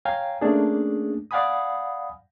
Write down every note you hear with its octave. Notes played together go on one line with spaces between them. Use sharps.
C#5 F5 G5 G#5 A#5
A3 A#3 C#4 D4 G#4
D5 F5 F#5 G#5 B5 D#6